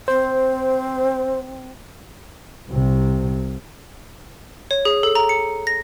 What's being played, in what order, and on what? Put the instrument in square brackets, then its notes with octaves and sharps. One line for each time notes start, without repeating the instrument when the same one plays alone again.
[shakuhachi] C4 [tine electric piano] C5
[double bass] C2 C3
[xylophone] C#5
G#4
A4
A#5
C#7
A#6